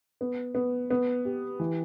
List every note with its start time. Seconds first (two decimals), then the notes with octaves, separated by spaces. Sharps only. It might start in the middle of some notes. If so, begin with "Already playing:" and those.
0.21 B3
0.55 B3
0.90 B3
1.25 G4
1.60 E3